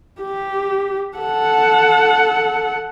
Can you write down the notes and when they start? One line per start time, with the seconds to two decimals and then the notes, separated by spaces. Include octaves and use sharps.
0.21 G4
1.17 A4 F#5